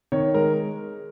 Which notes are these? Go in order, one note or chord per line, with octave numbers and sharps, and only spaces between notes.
D#3 C#5
G#3 A#4